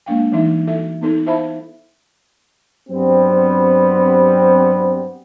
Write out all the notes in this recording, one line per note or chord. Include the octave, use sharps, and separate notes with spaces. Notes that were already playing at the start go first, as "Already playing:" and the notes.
G#3 A#3 D4 F5 G5
E3 G3 D#4 E5
E4 F#4 A4 E5
B3 D#4 A4
E4 C5 E5 F5 A5 B5
G2 F#3 G3 B3 C4